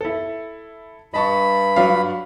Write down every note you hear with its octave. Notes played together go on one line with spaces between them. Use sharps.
E4 A4
G2 D#5 A5 B5 C#6
F#3 D4 F5